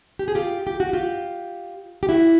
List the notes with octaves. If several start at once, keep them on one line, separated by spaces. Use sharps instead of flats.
G4
G#4
F4 G4
G4
F#4
F4 G4
G4
E4 F#4